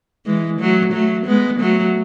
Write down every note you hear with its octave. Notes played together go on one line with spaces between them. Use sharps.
E3 G#3
F#3 A3
F#3 A3
G#3 B3
F#3 A3